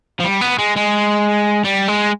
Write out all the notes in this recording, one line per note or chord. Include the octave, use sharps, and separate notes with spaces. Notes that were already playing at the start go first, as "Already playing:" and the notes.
F3
G3
B3
G#3
G#3
G3
G#3